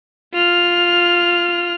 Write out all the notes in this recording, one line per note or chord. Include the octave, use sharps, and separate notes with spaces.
F4 F6